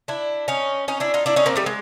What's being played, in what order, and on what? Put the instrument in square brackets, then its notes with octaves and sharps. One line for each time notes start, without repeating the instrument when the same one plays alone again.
[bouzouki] D4 E4
C#4 D#4
C#4 D#4
D4 E4
D#4 F4
D4 E4
C#4 D#4
A#3 C4
G3 A3
G#3